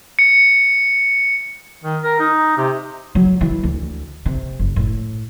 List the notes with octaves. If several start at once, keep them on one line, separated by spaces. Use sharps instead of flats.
C#7
D#3
A#4
D#4
C3
F#3
E3
D2
C3
F#1
A2